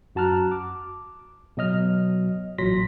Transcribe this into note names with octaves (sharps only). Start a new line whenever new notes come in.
F#2 F#4 A5 A#5 F6 F#6
D6
B2 F#3 D#5 F6
A1 A#2 F#3 C6 A#6 B6